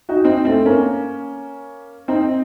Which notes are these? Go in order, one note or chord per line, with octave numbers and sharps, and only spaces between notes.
D#4 F#4
C4 D#4
A3 C4
A#3 C#4
C4 D#4